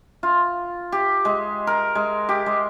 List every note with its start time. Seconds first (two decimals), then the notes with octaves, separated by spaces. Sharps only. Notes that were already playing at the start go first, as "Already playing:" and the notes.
0.23 F4
0.92 G4
1.25 G#3
1.67 A#4
1.95 G#3
2.29 G4
2.46 G#3